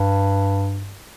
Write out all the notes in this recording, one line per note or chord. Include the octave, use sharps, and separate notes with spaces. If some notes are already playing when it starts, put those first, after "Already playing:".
Already playing: G2